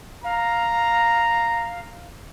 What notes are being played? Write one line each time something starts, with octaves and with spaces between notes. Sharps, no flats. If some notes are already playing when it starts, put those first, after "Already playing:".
F5 A#5